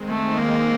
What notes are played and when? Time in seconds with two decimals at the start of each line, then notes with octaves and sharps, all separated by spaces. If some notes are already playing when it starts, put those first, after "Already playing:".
Already playing: D#3 G#3 C4
0.09 A3
0.38 A#3